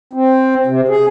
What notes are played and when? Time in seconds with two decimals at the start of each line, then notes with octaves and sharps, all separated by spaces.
0.13 C4
0.67 C3
0.89 G#4